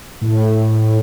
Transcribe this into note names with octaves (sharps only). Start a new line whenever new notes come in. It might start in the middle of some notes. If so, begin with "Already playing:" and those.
A2